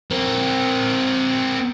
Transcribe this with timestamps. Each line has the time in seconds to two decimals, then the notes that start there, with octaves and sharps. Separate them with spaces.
0.11 C4 A#4